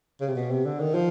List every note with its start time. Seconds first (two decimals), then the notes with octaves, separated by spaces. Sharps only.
0.21 C#3
0.28 C3
0.36 B2
0.51 C3
0.65 D3
0.80 D#3
0.94 F3